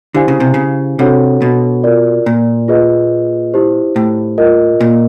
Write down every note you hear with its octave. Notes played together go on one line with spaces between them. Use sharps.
D3 E4 G4 C5 F5 G#5
C#3
C3
C#3
C3 D4 F#4 A4 C#5 F#5
B2
F4 A#4 D5
A#2
F4 G#4 B4 D#5
E4 G4 C5
A2
F4 A#4 D#5
A#2